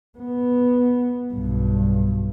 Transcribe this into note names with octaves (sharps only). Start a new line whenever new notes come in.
B3
B1 G2